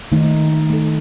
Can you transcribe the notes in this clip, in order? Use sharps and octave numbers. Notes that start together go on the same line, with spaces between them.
D#3 A3 D#4
A3 D#4 A4